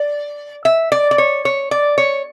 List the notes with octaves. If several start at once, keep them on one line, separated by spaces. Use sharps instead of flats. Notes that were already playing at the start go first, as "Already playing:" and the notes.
Already playing: D5
E5
D5
D5
C#5
C#5
D5
C#5